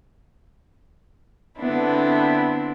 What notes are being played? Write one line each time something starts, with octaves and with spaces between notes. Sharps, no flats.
D3 B3 C4 D4 E4